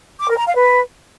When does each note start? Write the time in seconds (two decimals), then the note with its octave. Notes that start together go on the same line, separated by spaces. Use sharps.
0.19 D6
0.28 A#4
0.37 A#5
0.47 F5
0.56 B4